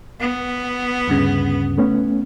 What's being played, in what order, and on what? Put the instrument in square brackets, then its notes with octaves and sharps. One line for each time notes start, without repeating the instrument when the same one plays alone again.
[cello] B3
[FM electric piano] D2 G2 C#3
[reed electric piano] A3 B3 C#4